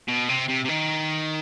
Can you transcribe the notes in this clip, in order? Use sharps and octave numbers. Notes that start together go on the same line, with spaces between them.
B2
C3
C3
C3
D#3